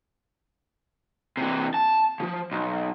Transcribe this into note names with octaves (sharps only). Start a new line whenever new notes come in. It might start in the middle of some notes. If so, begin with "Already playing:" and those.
C3 E3
A5
C#3 F3
B1